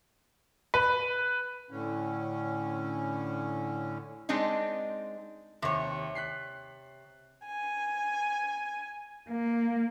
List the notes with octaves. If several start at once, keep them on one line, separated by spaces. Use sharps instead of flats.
B4
A2 D3 C#4
G#3 C4 D4 D#4
D#2 C3 C#5
F#6 B6 C7
G#5
A#3